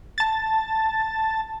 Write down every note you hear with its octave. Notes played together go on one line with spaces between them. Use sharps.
A5 A6